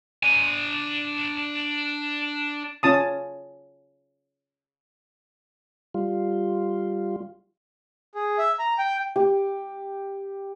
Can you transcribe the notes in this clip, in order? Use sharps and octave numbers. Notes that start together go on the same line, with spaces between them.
D4 G#5
C#4 F4 A5 D#6
G3 F4
G#4
E5
A#5
G5
G4